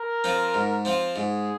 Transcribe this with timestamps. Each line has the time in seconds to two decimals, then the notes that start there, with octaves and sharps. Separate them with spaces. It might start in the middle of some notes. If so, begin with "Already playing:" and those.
Already playing: A#4
0.24 F3 C4 F4
0.54 G#2
0.85 F3 C4 F4
1.16 G#2 G#4